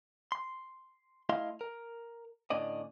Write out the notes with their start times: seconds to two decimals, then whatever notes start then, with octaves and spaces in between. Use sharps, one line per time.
0.32 C6
1.29 A3 E4 D#5 F5 C6
1.61 A#4
2.50 A2 D3 C#4 D5 D#5